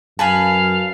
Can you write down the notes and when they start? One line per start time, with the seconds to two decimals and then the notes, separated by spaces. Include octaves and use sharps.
0.19 F#2 B4 F5 G#5 A5 B5